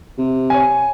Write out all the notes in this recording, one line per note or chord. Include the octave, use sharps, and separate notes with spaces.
C3
C#5 G#5